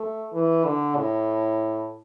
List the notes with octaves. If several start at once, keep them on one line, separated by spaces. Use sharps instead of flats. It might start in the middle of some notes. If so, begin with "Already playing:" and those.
Already playing: A3
E3
D3
A2